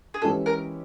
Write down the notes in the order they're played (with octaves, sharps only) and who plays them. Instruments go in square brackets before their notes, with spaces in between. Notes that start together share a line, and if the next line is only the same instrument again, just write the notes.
[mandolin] G#4
[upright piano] E3 G#3 C#4 E4 G4 [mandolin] A4
[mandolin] A#4